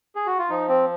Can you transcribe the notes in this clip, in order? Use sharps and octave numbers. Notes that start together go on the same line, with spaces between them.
G#4
F#4
F4
F3 D#4
C4